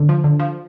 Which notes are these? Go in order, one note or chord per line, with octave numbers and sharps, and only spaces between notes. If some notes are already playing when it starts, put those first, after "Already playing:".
Already playing: D3
F3
D3
F3